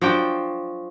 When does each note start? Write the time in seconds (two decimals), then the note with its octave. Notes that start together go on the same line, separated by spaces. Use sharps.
0.01 F3 F#3 D4 G5